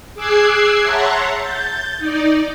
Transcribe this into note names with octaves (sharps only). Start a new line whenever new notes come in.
G#4 D6 E6 F#6 G#6 C7
C#5 E5 F#5 A5 A#5 C6
G6 A6
D#4 D5